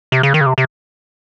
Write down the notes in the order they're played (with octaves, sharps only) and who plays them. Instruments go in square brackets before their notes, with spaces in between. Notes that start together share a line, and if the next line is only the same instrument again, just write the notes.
[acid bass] C3
C#3
D#3
C#3
C3
C3